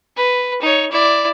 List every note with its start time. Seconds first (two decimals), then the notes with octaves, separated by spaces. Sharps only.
0.17 B4
0.61 D#4 C#5
0.91 E4 D5